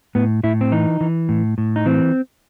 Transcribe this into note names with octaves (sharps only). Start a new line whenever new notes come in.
A2 B3
A2 E4
C4
E3 D#4
E3
A2
A2
D#4
E3 C4